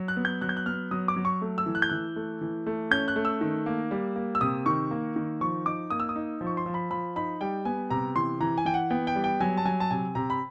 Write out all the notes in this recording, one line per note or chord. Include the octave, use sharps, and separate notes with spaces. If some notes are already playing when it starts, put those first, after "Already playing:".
Already playing: F#3
F#6
B3
G6
F#3 F#6
G6
F#6
B3 F6
F#3 D#6
D6
F#3
C#6
A3
E6
E3
F#6
G6
E3 F#6
A3
E3
A3
C#4 G6
F#6
A3
E6
D#3
A#3
G3
A#3
E6
C3 D#6
D#3 C#6
A#3
D#3
F3 C#6
D#4 D6
A#3 D#6
E6
D#6
D#4
F3
C#6
C6
F3
B5
F3 B5
D#4 B5
G3 G5
B3 G#5
C3 A#5
E3 C6
E3 A#5
G#5
E3 G5
F#5
B3 G5
G5
G3
G5
F#3 G#5
A5
F#3 G#5
A5
C3 G#5
C3 A#5
B5